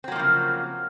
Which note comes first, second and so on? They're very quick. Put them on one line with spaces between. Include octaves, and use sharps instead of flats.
C4 F#3 A#3 F3 C#3